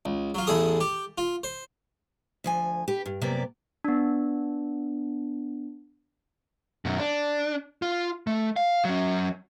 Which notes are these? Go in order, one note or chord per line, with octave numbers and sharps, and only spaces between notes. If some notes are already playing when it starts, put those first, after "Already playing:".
C#2
F#3 F4
A1 E2 G#4 A4 D#6
G4
F4
C5
D2 F3 G#5
G4 B4
G2
F#2 C3 A#3 B3 D5
B3 D4
F#2 B2
D4
F4
A3
F5
F#3 C#4